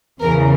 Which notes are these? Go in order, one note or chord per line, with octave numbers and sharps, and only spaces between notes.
E2 C#3 E3 A#4